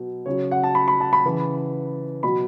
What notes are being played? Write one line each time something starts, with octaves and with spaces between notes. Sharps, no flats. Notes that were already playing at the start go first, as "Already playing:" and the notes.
Already playing: B2 F#3
C#3 F#3 C#5
F#5
A5
B5
B5
A5
B5
C#3 E3
B2 F#3 B5